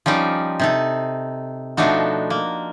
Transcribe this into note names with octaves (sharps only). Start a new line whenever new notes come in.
F3 G3 C#4 D#4 D5
C3 D#4 A4
B2 F3 A3 D4 D#4 F#4
A#3